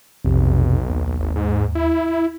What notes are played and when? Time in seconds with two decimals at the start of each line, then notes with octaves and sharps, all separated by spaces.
0.25 B1 F2 C3
0.90 D#2
1.20 G#1
1.36 G#2
1.75 E4